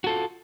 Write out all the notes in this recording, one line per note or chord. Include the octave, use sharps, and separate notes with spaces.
F4 F#4 A4